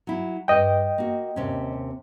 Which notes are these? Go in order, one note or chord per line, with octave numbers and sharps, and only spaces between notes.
F#3 E4
G2 D#5 G5
A#3 F#4
D#2 C3 C#4